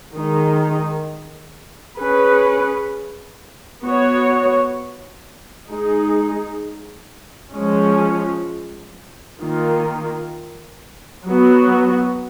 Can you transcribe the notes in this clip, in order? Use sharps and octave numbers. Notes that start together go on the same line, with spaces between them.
D#3 G#3 D#4
C#4 G#4 B4
B3 F#4 C#5
G#3 D#4 G#4
F3 G#3 C#4
D#3 A#3 F4
F#3 B3 F#4